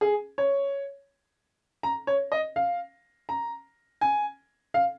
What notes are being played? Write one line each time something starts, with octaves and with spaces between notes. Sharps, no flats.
G#4
C#5
A#5
C#5
D#5
F5
A#5
G#5
F5